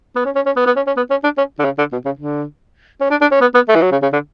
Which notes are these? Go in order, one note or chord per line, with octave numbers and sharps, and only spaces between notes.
B3
C#4
C#4
C#4
B3
B3
C#4
C#4
B3
C#4
D4
C#4
D3
C#3
D3
B2
C#3
D3
C#4
D4
D4
C#4
B3
B3
A3
E3
F#3
C#3
C#3
D3